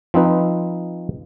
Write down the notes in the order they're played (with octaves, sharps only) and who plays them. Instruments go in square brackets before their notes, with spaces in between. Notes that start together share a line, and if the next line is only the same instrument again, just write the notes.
[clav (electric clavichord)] F3 C4 D#4 B4